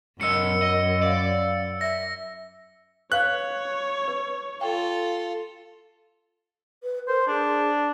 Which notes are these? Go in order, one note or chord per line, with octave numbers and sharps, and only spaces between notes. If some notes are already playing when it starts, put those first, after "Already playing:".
F#2 F#3 A#4 D#5 E6 C#7
D#5
D5 F5
E5 A#6
B4 C#5 F5 C#6 F#6
B4
F4 A4 G5 C#6
B4
A#4 C5
D4 G#4